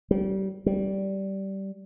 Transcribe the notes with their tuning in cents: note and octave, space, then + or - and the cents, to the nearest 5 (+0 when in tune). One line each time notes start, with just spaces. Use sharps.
G3 -25
G3 -15